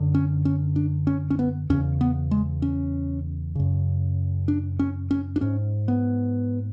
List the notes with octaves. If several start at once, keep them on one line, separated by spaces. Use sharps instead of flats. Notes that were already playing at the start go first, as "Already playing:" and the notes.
Already playing: F#2 D3
C#4
C#4
D4
C#4
C#4
B3
E2 C#3 C#4
B3
G#3
C#4
F#2 C#3
D4
C#4
C#4
D4
G#2 C#4
B3